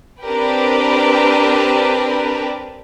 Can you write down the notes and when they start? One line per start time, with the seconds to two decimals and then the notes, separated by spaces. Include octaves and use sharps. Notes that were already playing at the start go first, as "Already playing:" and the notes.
0.24 C4 D4 G4 A#4 B4